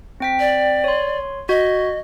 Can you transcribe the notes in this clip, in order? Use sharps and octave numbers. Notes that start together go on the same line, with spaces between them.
C4 G5 B6
D5
C#5 C6
F#4 D#5 G#6